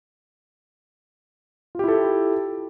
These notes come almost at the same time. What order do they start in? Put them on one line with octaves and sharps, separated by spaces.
F4 G4 E4 A4